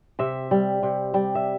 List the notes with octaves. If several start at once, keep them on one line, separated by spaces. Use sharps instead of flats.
C3 E5
G3
C3
G3
E5